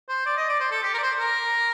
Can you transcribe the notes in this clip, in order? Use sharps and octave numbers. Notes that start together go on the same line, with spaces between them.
C5
D5
D#5
D5
C5
A4
G4
A#4
D5
C5
A#4